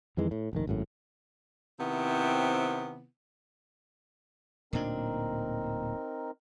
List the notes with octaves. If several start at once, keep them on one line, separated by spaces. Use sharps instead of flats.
F2 D#3 E3 G#3
A2
F1 A#1 D#3
G#1 F#2 A2
C3 D#3 B3 C4 E4
D1 A#2 C4 D4 D#4 A#4